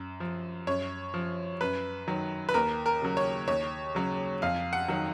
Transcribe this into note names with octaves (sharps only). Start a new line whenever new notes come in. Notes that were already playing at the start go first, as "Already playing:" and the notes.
Already playing: F#2
F3
F#2 C#5
F3
F#2 B4
D#3 F#3
B4
D#2 A#4
A#4
C#3 F#3
C#5
D#2 C#5
C#3 F#3
F2 F5
F#5
D#3 F#3